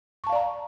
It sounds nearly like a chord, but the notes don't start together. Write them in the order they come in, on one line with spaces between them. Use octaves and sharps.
C#6 A5 F5 D5 A#5